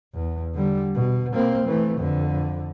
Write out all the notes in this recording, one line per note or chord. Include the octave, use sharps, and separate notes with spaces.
E2
D3 G3
B2
A#3 C4
E3 A3
F2 D3